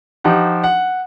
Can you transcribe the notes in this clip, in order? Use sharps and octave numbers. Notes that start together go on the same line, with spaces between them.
F3 D#4 G4 F#5
F#5